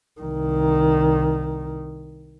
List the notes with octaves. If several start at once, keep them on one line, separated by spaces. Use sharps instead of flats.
C2 D#3